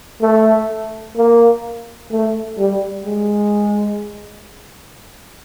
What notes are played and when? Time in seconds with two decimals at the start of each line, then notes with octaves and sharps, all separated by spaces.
0.21 A3
1.17 A#3
2.11 A3
2.59 G3
3.05 G#3